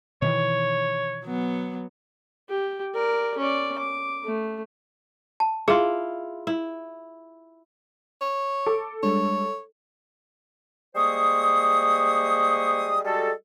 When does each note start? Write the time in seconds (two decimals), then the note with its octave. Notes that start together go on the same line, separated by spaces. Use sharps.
0.22 B2 D#3 E3 C#5
1.24 F#3 B3
2.49 G4
2.94 A#4 D5
3.38 C#4 D5
3.78 D6
4.25 A3
5.40 A5
5.68 E4 F4 G#4
6.47 E4
8.22 C#5
8.66 A4 D6
9.03 G3 G#3 D4 C#5
10.95 G3 G#3 A#3 C5 C#6 D#6
13.05 G3 G#3 F#4 A4